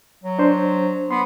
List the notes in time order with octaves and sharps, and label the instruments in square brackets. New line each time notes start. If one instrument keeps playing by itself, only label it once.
[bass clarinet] F#3
[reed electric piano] D4 C5
[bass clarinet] B3 [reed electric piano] C6